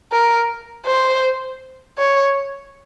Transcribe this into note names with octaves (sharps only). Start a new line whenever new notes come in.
A#4
C5
C#5